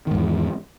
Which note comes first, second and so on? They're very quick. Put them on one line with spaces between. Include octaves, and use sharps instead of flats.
D#3 G#2 E2